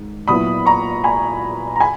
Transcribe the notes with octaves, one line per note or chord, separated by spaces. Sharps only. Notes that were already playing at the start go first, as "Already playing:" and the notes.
Already playing: G#2 D#3
A#2 F#3 B3 E4 B5 D#6
A#5 C#6
G#5 B5
A#5
G#5 B5